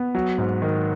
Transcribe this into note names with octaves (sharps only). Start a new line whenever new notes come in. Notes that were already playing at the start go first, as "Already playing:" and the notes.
Already playing: B3
F#3
G#2
D#3